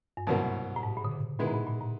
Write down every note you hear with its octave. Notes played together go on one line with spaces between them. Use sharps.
G2
C2 G#2 B2 F#3 A#3
A2
G#2
A#2
D3
C#3
A#2 D#3 G#3 B3 E4
A2
A#2
A#2
A2